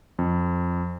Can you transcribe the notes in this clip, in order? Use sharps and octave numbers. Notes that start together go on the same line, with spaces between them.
F2